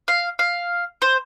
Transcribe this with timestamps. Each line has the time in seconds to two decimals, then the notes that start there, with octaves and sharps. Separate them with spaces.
0.08 F5
0.39 F5
1.02 C5